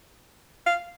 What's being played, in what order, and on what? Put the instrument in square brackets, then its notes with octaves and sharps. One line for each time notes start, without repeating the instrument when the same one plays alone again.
[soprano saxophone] F5